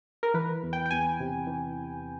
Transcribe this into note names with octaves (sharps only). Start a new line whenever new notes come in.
A#4
E3 B4
E2
G5
G5
E2 G#5
C3
E3